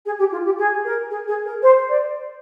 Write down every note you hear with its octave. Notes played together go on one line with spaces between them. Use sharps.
G#4
G4
F4
G4
G#4
A#4
G#4
G#4
A#4
C5
D5